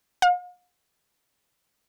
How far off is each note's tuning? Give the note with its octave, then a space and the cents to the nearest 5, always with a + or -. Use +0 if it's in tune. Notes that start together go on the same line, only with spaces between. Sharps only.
F5 +45